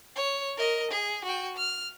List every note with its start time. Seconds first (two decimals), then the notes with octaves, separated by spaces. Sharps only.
0.16 C#5
0.57 A#4 D#5
0.91 G#4
1.24 F#4 G5
1.56 F6